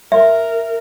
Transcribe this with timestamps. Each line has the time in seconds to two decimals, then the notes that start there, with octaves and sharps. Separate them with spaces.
0.12 A#4 E5